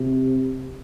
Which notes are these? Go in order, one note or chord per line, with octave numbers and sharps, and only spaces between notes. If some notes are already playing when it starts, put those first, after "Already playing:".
Already playing: C3